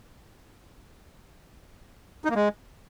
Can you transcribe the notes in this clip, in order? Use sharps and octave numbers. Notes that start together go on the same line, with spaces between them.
D#4
A#3
G#3